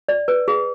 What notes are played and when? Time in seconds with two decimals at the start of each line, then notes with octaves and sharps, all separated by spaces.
0.09 D5
0.28 B4
0.48 G#4